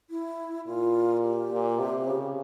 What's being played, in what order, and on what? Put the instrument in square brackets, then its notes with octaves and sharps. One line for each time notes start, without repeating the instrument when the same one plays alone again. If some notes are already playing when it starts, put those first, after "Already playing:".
[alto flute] E4
[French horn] A#2 [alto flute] F4
[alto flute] G4
[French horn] A#2
C3
C#3